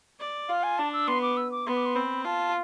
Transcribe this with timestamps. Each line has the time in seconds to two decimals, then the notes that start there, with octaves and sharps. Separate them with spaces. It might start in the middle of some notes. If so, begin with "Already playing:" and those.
0.20 D5
0.49 F4 F5
0.63 G#5
0.78 D4 A5
0.93 E6
1.08 B3 C6
1.22 D6
1.37 E6
1.52 D6
1.66 B3 C6
1.76 D6
1.86 C6
1.95 C4 B5
2.25 F4 A5